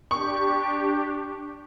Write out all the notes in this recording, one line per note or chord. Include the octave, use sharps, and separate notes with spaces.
D4 G4 C#6